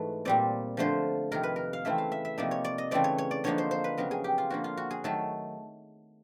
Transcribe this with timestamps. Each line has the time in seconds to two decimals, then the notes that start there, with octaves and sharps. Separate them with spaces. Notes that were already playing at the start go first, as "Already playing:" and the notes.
Already playing: G#2 E3 A3 F#4
0.25 A#2 G3 C4 D5
0.77 D3 F3 A3 C5
1.31 F2 C3 D#3 A#4
1.43 B4
1.56 A#4
1.73 F5
1.85 C#3 E3 A3 C4 E4 E5
1.98 F5
2.12 E5
2.25 E5
2.38 C3 F3 A#3 D#4 D5
2.51 C#5
2.64 D5
2.78 D#5
2.91 C#3 E3 A3 C4 D5
3.04 C#5
3.18 C#5
3.31 D5
3.44 D3 F3 A#3 D#4 C#5
3.58 C5
3.71 C5
3.84 B4
3.97 F2 C#3 F#3 B3 A#4
4.11 G#4
4.24 G4
4.38 F4
4.50 D3 F3 A#3 F#4
4.64 F4
4.77 F#4
4.91 G#4
5.04 D#3 F#3 A3 A4